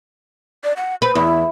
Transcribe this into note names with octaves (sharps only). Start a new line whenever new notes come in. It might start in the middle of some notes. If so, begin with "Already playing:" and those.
D5
F#5
B4 C5
E2 E4